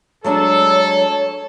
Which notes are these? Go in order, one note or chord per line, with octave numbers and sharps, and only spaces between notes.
F#3 G#3 D4 A4 C#5